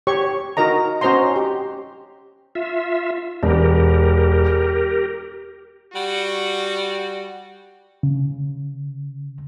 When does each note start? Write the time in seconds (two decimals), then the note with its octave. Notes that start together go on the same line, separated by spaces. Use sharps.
0.07 G4 C#5 C#6
0.57 D#4 F#4 A#4 D#5 A#5
1.01 C#4 F#4 C5 D#5 A#5 C6
1.36 G4
2.55 F4 E5
3.43 E1 G4 A#4
5.93 G3 F#4
8.03 C#3